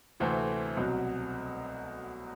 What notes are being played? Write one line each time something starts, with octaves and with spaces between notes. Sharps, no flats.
D2 C3 E3 A3 C4
C2 B2 F#3